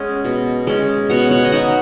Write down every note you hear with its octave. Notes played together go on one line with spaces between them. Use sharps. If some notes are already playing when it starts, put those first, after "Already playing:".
Already playing: G#3 C#4 D#5 F#5
B2
G#3 C#4
B2 C#5 F#5
C#5 F#5
D#5
F#3 D#4 C#5 F#5